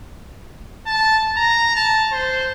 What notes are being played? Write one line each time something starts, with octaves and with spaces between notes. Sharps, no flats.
A5
A#5
A5
C5